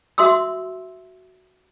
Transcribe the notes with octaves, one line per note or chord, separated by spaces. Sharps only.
F#4 E5 C6 D#6 E6